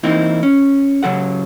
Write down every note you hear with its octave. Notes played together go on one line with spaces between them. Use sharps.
E3 A#3 C4 D#4 E4
C#4
C#3 F#3 A4 F#5